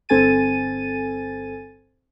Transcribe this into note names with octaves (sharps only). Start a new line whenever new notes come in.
G1 C4 A4 G#5 A6 D#7